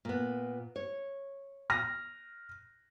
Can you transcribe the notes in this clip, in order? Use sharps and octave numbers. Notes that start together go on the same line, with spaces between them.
A#2 B3
C#5
F6 A#6